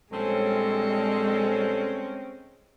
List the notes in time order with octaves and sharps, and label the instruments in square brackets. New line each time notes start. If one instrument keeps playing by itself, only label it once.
[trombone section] A#1 G3 A4 [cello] G#3 [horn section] C4 C#4